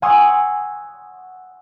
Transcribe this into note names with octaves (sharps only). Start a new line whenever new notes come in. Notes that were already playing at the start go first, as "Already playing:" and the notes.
F#5 G#5 C6 C#6 D#6 E6